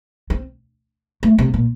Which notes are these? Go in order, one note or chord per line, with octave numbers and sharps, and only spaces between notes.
C4
A3
C3
A#2